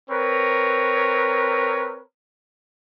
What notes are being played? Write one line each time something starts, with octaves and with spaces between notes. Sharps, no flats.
C4 A#4 B4 C#5